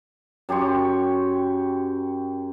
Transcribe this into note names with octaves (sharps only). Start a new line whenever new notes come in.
F#2 G4 C6 C#6